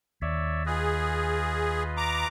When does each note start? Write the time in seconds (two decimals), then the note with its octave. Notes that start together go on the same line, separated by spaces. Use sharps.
0.22 D#2 C#5 D5 E5
0.66 F4 G#4 B4 D#5
1.97 A#5 D6